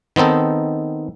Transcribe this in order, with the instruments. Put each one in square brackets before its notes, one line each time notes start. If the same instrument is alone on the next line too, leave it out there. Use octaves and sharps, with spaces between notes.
[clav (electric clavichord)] D#3 B3 C4 D#4 A4